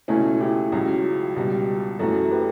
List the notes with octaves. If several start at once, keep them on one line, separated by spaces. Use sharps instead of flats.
C#2 B2 A3 C#4 E4
E4 G4
C#2 C#3 F#3
C#2 B2 G3
F#2 E3 A3 F#4 A4
G4 B4